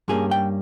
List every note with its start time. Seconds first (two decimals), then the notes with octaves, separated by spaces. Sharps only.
0.08 G2 G3 A#3 C#4 G#4
0.31 G5